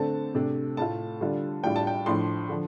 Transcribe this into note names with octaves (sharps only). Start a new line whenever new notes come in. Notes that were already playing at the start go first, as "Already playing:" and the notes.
Already playing: D3 A3 C4 A5
C3 A3 D4
A2 A3 F4 A5
D3 G3 F4
A2 G3 D4 F4 G5
A5
G5
A2 F3 D4 C6
D3 F3